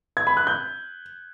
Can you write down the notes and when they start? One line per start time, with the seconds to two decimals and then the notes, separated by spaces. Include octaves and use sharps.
0.17 G#6
0.27 B5
0.37 F#6
0.47 G6